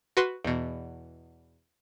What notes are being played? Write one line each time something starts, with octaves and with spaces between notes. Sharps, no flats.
F#4 B4 C6
E2 B2